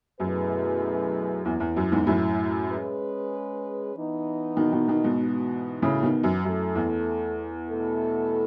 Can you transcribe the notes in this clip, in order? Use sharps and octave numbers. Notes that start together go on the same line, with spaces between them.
F#2 B2 A3 E4 G#4 B4
E2 A3 C#4 E4
E2
F#2
E2 G#2
F#2 A2
G#3 C#4 G#4 B4
E3 B3 D#4
B2 D#3
B2 D#3
B2 D#3
G#2 B2
E3 B3 F#4
A2 C#3
B2 D#3
F#2
F#2 A3 E4 A4
E2
B2 A3 E4 A4